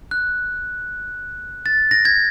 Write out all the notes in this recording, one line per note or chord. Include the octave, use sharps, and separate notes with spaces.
F#6
A6
A#6
G#6